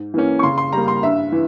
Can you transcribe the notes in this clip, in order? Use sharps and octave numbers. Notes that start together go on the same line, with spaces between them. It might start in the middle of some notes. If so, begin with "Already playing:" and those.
Already playing: G#2
E3 A#3 C#4
C#6
C#3 C6
C6
G3 A#3 A#5
C6
G2 E5
E3